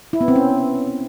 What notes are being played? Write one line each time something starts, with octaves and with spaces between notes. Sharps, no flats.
E4
B3
C4
C#4